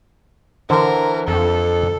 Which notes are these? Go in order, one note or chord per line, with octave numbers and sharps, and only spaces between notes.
D3 E3 A#4 C5
F2 A4